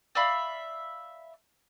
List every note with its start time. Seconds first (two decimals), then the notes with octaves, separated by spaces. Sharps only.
0.15 D5 E5 F5 B5